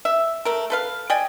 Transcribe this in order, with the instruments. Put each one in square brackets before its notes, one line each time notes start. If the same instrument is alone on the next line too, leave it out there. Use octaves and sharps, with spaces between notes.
[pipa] E5
A3 A#4
A4 B4 F5
D5 D#5 G5 G#5